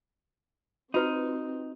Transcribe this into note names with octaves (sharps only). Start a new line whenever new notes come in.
C4 D#4 F4 F#4 B4